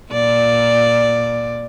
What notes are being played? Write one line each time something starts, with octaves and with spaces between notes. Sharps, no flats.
A#2 D5